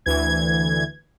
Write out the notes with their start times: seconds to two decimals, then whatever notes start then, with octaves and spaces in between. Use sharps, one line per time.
0.06 D2 E3 G#6